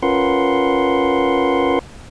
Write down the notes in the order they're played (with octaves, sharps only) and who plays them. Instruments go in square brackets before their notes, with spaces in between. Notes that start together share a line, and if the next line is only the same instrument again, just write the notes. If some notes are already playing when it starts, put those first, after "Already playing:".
[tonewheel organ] C#4 F4 A#4 B4 F#5 C6